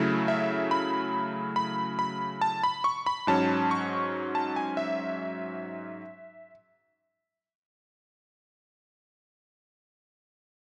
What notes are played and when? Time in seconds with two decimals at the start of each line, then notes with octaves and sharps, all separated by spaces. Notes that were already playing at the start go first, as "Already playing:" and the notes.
Already playing: C#3 F#3 A3 E4
0.28 E5
0.71 B5
1.56 B5
1.99 B5
2.41 A5
2.64 B5
2.84 C#6
3.06 B5
3.27 G#2 F#3 C#4 A5
3.71 C#6
4.35 A5
4.56 G#5
4.77 E5